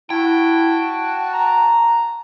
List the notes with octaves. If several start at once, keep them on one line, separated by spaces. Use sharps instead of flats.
E4 F#4 G5 A5
A#5